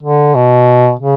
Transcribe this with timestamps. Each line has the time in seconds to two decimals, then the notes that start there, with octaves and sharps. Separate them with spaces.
0.03 D3
0.35 B2
1.00 C#3